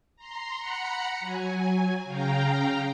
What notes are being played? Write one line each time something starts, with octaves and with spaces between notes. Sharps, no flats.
A#5 C6
F#5 A#5 B5 C#7
F#3 G#5
C#3 F5 G5 A#5